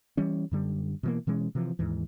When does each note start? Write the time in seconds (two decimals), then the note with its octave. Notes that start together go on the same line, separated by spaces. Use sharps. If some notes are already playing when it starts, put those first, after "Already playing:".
0.17 E3 G3 C#4
0.51 F#2 D3 G3
1.03 B2 E3 A#3
1.27 B2 E3 G#3 C#4
1.55 C3 E3 F3
1.79 D#2 G#2 E3